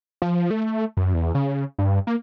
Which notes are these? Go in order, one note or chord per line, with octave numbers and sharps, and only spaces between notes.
F3
A3
F#2
E2
C#3
G2
A#3